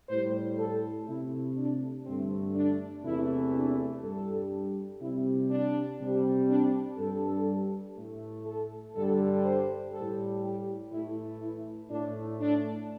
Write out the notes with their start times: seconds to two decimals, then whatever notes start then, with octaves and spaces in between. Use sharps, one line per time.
0.09 A2 G3 C5
0.58 A4
1.08 C3 A3 E4
1.57 D4
2.06 G2 D3 A3 C4
2.55 D4
3.04 E2 C3 E3 A3 E4
3.54 D4
4.03 G2 G3 A4
5.01 C3 G3 E4
5.51 D4
6.00 C3 G3
6.49 D4
6.98 G2 G3 A4
7.97 A2 A3
8.46 A4
8.95 G2 D3 G3 A4
9.44 C5
9.94 A2 G3 A4
10.43 G4
10.92 A2 E3 A3 E4
11.41 E4
11.90 A2 A3 D4
12.40 D4